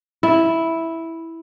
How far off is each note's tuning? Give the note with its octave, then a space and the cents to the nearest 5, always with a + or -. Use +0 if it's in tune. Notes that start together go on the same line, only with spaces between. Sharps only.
E4 -5